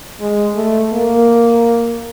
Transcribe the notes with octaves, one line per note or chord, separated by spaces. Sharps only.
G#3
A3
A#3